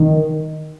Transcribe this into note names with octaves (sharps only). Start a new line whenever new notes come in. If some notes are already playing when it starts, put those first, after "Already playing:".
Already playing: D#3